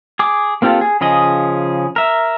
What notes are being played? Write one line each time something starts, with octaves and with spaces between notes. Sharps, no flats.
G#4 D6
A#3 C4 F4 G4 A4
G#4
C#3 F3 G#4 D#5
A#4 E5